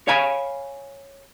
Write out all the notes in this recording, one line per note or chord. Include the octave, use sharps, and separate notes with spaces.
C#5 F5 G#5 B5